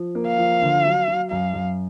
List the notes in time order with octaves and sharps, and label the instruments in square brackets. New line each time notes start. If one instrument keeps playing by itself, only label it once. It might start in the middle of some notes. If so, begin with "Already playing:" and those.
Already playing: [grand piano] F3
A#3
[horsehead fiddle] F5
[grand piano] F3
D3
F#3
F#3
[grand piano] F#2 [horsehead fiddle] F5
[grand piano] F#2